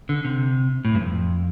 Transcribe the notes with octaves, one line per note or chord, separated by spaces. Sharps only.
D3
C3
A2
G2
F2